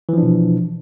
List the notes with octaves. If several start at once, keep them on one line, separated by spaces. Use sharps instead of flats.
B2 E3 F3 D4